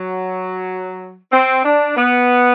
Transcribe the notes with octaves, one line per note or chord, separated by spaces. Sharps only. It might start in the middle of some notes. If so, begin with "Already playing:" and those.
Already playing: F#3
C4
D4
B3